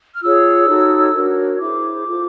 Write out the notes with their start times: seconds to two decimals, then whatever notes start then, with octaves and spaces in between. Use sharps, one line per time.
0.14 F6
0.22 F4 G#4 C#5 E6
0.68 D#4 F#4 A4 C#5
1.14 D4 F#4 A#4 C#5
1.60 E4 G#4 C5 D6
2.05 F4 A4 C5